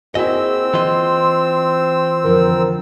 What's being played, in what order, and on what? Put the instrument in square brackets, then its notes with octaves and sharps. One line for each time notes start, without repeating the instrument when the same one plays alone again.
[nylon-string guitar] A#3 F#4 [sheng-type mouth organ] C4 E6 [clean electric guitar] E4 D#5 [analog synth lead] G#4
[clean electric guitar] E3 F4 D#5 [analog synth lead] C6
[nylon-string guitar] F2 D3 F3 [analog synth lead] A#4